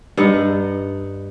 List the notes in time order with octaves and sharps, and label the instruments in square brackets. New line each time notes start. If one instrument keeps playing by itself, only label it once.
[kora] G2 D#4 F#5